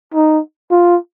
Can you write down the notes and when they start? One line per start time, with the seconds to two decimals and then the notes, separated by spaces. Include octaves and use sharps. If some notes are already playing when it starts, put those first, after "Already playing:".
0.14 D#4
0.71 F4